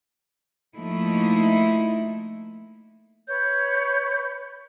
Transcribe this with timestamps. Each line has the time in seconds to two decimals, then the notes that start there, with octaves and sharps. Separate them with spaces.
0.76 F3 A3 A#3 D#4 E4
3.27 B4 C#5 G6